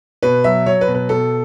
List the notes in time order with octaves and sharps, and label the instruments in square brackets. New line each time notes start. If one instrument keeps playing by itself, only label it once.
[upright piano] B2 B4
F#3 E5
F#3 C#5
B4
B2
B4
B2 A4